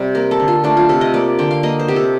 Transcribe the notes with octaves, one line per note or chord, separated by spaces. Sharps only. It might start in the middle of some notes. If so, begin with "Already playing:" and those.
Already playing: C3 G3 C5
A#3 A#4
A4
D3
F4
A3 D4
F4
C3 A4
D#5
A#3 D5
D3 G5
F5
A#3 D#5
C5
C3 G4
A4